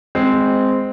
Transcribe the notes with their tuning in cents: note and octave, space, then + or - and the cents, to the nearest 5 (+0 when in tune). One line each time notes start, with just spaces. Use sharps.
G#3 +0 C4 -10